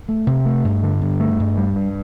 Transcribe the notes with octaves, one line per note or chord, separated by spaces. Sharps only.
A3
C3
A3
G2
D3
G2
A3
G2
G3
G2